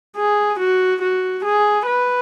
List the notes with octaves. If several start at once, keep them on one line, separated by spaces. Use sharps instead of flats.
G#4
F#4
F#4
G#4
B4